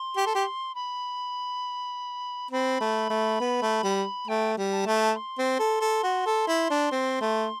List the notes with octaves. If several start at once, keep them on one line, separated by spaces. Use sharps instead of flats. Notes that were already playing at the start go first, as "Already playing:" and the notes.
Already playing: C6
G4
A4
G4
B5
C4 B5
A3
A3
B3
A3
G3
A3 G5
G3
A5
A3
A5
C6
C4
A4
A4
F#4
A4
E4
D4
C4
A3